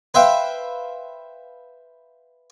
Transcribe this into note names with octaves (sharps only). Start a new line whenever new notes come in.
B4 C5 E5 F5 G5